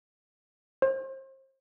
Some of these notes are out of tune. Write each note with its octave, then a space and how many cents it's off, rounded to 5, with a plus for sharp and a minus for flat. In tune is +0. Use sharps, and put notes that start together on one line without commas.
C5 +35